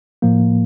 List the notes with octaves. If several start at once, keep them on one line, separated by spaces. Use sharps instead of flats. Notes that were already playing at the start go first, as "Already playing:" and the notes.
A2 F3 A#3